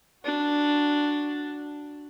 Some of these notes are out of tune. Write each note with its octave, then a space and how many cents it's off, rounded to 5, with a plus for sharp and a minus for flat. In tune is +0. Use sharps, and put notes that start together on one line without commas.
D4 +0 F#4 +0